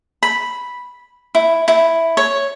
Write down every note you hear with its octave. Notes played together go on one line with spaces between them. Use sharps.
B5
E4
E4
C#5